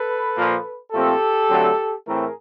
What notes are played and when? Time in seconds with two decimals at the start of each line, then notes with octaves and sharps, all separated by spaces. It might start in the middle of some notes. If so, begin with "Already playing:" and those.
Already playing: A4 B4
0.36 A#2 F3 A#3
0.92 A#2 F3 A3 C4 G4 A4
1.49 D3 F#3 A3 C4
2.06 A2 E3 A3 C4 G#4 A#4